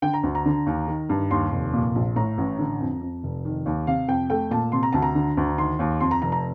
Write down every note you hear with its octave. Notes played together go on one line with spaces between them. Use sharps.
D3 G5
A#5
D2
A#5
D3
D#2
D#3
G2
D#2 C6
F1
A#2
A#1
A2 A#5
A1
D3
F2
F2
F1
D#3
D#2
C3 F5
F2 G5
A3 G5
A#2 A5
C3 C6
A#5
D2 A5
A#5
D3
D2
D#3 C6
D#2
F2 C6
A#5
F1 A#5
A#5